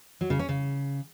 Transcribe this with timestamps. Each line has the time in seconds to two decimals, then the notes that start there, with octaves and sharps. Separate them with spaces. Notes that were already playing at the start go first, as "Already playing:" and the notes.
0.21 F#3
0.30 C#3
0.39 C#4
0.49 C#3